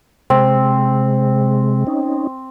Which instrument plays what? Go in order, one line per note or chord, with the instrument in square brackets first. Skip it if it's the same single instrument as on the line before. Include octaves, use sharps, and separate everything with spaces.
[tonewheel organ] C3 G#3 [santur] C4
[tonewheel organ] C#4 D#4